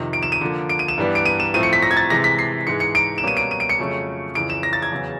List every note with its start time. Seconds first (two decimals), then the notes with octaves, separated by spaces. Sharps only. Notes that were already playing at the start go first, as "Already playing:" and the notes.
Already playing: F2 C3 D#3
0.13 D7
0.23 E7
0.32 D#7
0.41 D3 F3 A#3
0.69 D7
0.79 D#7
0.88 E7
0.98 G2 E3 G3 B3
1.15 D7
1.26 D#7
1.40 E7
1.54 A2 F3 A3 C4 D#7
1.63 C#7
1.73 B6
1.82 A#6
1.91 G#6
1.97 A6
2.10 C3 E3 G#3 A#6
2.24 B6
2.39 C7
2.67 G#2 E3 G#3 C#7
2.80 C#7
2.95 D7
3.18 E7
3.23 B2 G3 A#3 C#4 D#7
3.37 D7
3.51 D#7
3.60 D7
3.69 C#7
3.79 F2 C#3 F#3 A3 C#4
4.35 F2 C#3 E3 D7
4.50 E7
4.63 A#6
4.73 A6
4.82 G#6
4.92 E2 C#3 F#3